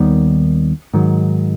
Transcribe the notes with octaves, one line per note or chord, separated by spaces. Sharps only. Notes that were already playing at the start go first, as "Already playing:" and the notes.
Already playing: D#2 D#3 G3 B3
G#2 D#3 F#3